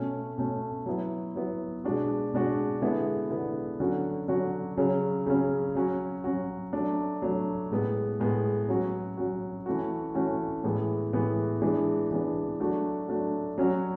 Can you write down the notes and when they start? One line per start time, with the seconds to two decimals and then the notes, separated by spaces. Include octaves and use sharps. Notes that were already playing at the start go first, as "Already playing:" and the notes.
Already playing: B2 A3 C#4
0.38 B2 A3 C#4
0.86 F#3 B3 E4
1.35 F#3 B3 E4
1.84 B2 G#3 D4 F#4
2.33 B2 G#3 D4 F#4
2.82 D3 G#3 B3 E4
3.31 D3 G#3 B3 E4
3.80 D3 F#3 C#4 F#4
4.28 D3 F#3 C#4 F#4
4.77 C#3 F#3 C#4
5.26 C#3 F#3 C#4
5.75 F#3 C#4 F#4
6.24 F#3 C#4 F#4
6.73 F#3 A3 D4
7.22 F#3 A3 D4
7.71 A2 G#3 B3
8.20 A2 G#3 B3
8.69 F#3 C#4 F#4
9.17 F#3 C#4 F#4
9.66 E3 A3 C#4 F#4
10.15 E3 A3 C#4 F#4
10.64 A2 E3 G#3 B3
11.13 A2 E3 G#3 B3
11.62 E3 G#3 B3 D4
12.11 E3 G#3 B3 D4
12.60 F#3 A3 D4 F#4
13.08 F#3 A3 D4 F#4
13.58 F#3 C#4 F#4